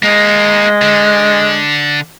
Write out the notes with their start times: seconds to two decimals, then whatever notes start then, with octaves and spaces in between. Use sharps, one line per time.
0.03 G#3 A#3 D#4
0.82 D3